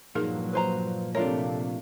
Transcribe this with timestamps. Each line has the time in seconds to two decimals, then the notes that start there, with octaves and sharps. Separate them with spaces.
0.15 G2 A#2 F3 F#3 A#3 D#4 G#4 A#4
0.53 B4 C5 A#5
1.15 C3 A3 D4 F4 A#4 C#5